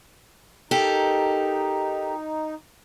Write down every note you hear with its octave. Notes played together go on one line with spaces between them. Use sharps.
D#4 G4 A4 A#4